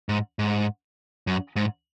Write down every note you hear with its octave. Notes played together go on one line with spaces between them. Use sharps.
G#2
G#2
F#2
G#2